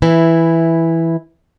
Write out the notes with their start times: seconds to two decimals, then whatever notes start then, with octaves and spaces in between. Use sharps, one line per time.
0.02 E3 E4